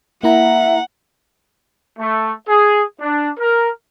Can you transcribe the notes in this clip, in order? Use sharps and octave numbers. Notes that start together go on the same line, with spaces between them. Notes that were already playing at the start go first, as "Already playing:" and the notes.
A#3 E4 E5 F#5 A#5
A3
G#4
D4
A#4